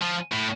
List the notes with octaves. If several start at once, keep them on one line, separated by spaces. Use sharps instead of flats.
F3
A2